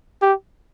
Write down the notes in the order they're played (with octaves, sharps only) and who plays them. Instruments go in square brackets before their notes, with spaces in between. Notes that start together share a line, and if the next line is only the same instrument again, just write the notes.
[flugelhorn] G4